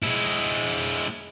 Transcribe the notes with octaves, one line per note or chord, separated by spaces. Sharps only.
G#3 E4